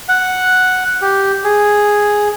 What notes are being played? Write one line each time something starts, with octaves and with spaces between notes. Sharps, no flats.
F#5
G4
G#4